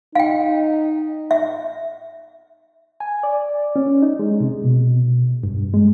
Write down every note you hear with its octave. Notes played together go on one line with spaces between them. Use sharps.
D#4 F5 G5
E5
G#5
D5
C#4
D#4
G#3
C3
B2
G2
G#3